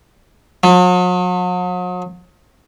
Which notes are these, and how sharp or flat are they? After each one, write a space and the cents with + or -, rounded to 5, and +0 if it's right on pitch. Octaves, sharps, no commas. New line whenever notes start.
F#3 -45